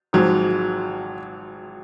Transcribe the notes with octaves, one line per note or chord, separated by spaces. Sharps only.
G#1 G#2 F3 F#3